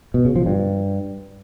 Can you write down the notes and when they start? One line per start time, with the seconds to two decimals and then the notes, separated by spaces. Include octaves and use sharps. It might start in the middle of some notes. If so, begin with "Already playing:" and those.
0.14 B2
0.25 C#3
0.36 F3
0.46 G2